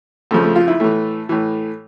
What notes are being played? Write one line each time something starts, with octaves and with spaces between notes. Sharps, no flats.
F2 C#3 F3 A3
A3
F4
E4
A2 E3 A3
A2 E3